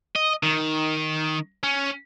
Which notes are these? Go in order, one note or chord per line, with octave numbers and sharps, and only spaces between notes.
D#5
D#3
C#4